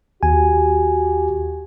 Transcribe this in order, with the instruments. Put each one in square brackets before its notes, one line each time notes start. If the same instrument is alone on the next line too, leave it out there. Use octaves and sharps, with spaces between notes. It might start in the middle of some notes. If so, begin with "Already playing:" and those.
[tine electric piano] D#2 G#5 [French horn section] F#4 G4